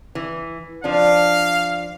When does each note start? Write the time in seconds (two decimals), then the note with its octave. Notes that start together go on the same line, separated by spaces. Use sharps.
0.15 E3
0.84 F3 D4 F5